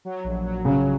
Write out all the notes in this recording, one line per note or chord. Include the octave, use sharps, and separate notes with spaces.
F#3
A#1
F#3
C#3 F#3